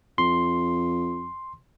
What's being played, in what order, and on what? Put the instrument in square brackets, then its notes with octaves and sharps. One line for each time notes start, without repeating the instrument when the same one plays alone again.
[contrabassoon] F2 [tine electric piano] C6